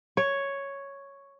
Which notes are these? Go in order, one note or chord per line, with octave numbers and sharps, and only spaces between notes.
C#5